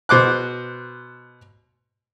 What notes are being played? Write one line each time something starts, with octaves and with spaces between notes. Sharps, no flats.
B2 C5 D6 F#6